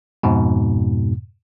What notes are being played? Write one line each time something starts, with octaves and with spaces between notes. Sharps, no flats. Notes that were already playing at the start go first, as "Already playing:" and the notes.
F2 G#2 B2